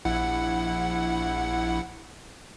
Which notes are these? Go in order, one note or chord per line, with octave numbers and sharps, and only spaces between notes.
A#1 E4 F#5